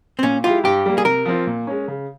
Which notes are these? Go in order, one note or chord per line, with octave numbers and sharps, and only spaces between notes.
C4
A#2 C#4
G#3 E4 F4 G4
G2 G4
G3 A#3
G#4
C3 A#4
F3 C4 F4
A#2
G#3 C#4
C#3